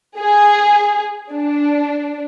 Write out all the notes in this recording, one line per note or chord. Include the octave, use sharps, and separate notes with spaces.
G#4
D4